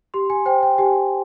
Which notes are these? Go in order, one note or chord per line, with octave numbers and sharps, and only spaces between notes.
G4 C6
G#5
C5 G5
G5
G4 G#5